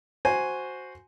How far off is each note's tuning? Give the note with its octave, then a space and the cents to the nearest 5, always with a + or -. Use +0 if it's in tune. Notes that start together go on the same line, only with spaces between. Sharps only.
F#4 +0 C5 +0 G#5 +0